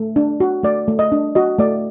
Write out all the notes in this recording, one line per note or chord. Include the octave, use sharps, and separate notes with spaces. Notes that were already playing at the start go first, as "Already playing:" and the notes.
Already playing: A3
D4
F#4
A3 D5
A3
D#5
D4
F#4 D#5
A3 D5